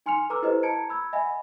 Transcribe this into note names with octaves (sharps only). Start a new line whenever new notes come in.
D#4 G#5 C6 F6 C#7 F7
A4 B4 A#5 D6 E6 F6
E4 G4 A4 B4 C5 D#5
A5 A#5 G#6 C#7 D7
B5 E6 G#6
D#5 E5 F#5 G#5 B5